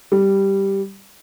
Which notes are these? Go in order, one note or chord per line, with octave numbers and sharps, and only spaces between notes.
G3